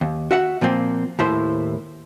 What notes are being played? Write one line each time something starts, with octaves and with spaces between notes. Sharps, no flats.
D#2
F#4 E5 F#5
A#2 F3 A#3 C4
D#2 A2 E4 C5